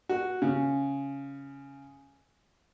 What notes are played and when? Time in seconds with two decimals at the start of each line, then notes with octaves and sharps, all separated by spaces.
0.09 F#4
0.42 C#3